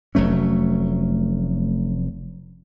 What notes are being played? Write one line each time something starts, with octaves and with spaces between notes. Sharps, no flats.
F1 F#3 A3 C#4